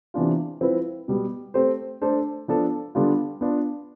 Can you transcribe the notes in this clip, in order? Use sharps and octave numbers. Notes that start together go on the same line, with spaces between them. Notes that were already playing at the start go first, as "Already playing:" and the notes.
C3 E3 B3 D4 F4
F3 C4 E4 B4
B2 G3 B3
A3 C4 G4 C5
A3 D4 A4 C5
F3 B3 D4 A4
D3 G3 B3 D4 F4
B3 D4 F4